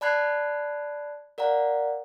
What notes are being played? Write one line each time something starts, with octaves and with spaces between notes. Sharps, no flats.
D5 A5 B5 F#6 G#6 C7
A#4 D5 F5 F#5 A#5